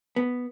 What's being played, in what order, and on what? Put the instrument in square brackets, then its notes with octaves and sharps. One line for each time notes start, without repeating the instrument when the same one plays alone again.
[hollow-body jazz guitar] B3